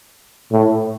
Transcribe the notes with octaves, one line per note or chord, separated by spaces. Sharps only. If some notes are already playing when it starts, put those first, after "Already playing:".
A2